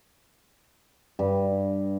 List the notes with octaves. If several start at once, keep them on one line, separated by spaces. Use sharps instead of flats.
G2